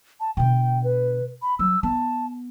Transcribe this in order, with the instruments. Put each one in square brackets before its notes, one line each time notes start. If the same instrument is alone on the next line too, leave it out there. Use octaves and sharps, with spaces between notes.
[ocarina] A5
[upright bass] B2 D3 [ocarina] G5
[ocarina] B4
B5
[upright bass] F#3 [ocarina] E6
[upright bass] B3 [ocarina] A5